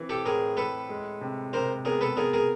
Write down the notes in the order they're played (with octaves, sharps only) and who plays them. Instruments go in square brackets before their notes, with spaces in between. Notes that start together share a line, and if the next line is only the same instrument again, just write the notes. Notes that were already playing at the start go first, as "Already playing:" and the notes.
Already playing: [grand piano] E3 C4
[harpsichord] G4 A4
[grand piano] A2 [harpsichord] G#4 A#4
[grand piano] A2 [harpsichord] A4 B4
[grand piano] G#3
C3
[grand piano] C3 [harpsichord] A#4 C5
[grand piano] B3 [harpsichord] G#4 A#4
[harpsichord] A4 B4
[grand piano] B3 [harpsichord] G#4 A#4
[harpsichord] G#4 A#4